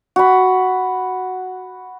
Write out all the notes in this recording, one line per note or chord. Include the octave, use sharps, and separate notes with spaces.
F#4 B5